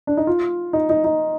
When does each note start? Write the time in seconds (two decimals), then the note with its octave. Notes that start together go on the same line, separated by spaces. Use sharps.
0.07 D4
0.17 D#4
0.27 F4
0.73 D#4
0.89 D#4
1.04 D#4